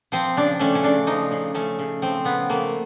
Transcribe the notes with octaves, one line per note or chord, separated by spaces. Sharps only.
F3 C4
C#3 D4
A3 C#4
C#4
C#3 D4
F3 D#4
C#3
A3 C#4
C#3
F3 C4
C#3 B3
A3 A#3